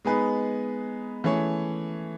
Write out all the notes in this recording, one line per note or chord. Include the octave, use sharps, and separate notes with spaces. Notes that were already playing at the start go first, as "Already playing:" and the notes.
G#3 B3 D#4 G#4 B4
E3 A3 C#4 G#4 C#5